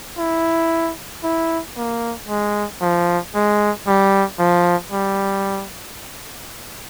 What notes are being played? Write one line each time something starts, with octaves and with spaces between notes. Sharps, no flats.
E4
E4
A#3
G#3
F3
G#3
G3
F3
G3